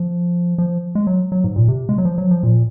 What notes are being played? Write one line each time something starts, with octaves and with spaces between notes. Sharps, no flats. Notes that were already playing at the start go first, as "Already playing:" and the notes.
Already playing: F3
F3
G#3
F#3
F#3
G#2
A#2
C3
G#3
F#3
F3
F#3
F3
A#2